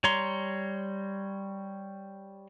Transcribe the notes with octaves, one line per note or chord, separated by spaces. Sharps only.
G3 C#5 A#5 C6